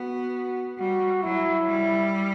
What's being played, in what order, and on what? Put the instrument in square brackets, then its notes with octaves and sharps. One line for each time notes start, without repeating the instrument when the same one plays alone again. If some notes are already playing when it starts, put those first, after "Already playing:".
Already playing: [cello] B3 [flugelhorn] F#4
[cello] G3 [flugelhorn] F#4
[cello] F#3 [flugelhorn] E4
[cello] G3